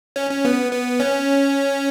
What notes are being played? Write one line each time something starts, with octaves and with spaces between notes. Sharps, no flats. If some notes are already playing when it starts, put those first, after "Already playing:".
C#4
C#4
B3
B3
C#4